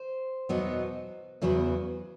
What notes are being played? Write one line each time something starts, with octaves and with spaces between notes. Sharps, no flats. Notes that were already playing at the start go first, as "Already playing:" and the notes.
Already playing: C5
E2 B2 F#3 B3 D#4
E2 C#3 F#3 B3